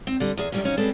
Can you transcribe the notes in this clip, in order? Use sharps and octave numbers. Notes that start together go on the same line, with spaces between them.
C4
D3 G3
E2 G#4
F#2 A2 F#3 G3 C4 C#4
F3 F#3 C#4 D#4
G3 G#3 C4 C#4 A4 B4